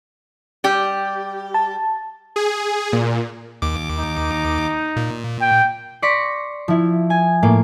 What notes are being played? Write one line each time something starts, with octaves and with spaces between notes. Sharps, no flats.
G3 G4
A5
G#4
A#2
D#2 D6
D#4
A#2
G5
D5 C6 C#6 A#6 B6
F3 E4
G#5
A2 A#3